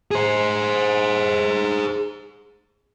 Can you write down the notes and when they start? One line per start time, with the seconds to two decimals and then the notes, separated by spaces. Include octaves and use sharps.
0.11 G#4 C5